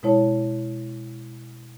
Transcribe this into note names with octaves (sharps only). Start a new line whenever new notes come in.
B2 G#3 E4 C#5 A5